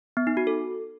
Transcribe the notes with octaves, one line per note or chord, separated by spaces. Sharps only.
B3
D#4
F#4
A4